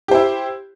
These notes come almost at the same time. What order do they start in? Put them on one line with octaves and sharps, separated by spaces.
G4 C5 E4